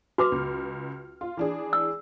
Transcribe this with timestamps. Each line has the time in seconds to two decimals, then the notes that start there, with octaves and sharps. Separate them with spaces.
0.18 F#4 B4 D6 F6
0.32 C#2
1.21 F4
1.37 E3 D4 G#4
1.73 E6